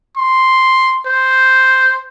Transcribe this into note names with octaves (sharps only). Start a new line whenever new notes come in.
C6
C5